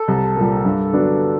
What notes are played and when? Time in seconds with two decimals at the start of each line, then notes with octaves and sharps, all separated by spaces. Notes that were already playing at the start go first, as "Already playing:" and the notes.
Already playing: A4
0.08 C2
0.36 A#2 G3
0.65 G2
0.93 D3 F#3 B3 D4